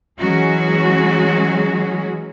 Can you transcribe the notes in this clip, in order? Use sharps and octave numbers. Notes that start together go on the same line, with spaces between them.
E3 F#3 G#3 C#4 F#4 G#4